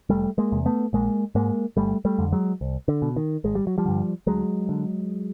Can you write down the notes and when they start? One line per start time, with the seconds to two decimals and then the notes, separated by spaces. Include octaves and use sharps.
0.09 F1 G3 A3
0.38 G#3 A#3
0.52 E2 C3
0.66 A3 B3
0.93 A#1 G#3 A#3
1.35 G#2 G#3 A#3
1.77 G1 G3 A3
2.05 G3 A3
2.19 F2 D3
2.33 F#3 G#3
2.61 C2
2.88 D3
3.02 B2
3.16 D#3
3.44 G#1 G#3
3.55 G3
3.67 F#3
3.78 F3 G3
3.86 G2 D3
4.27 D2 F#3 G#3
4.69 D3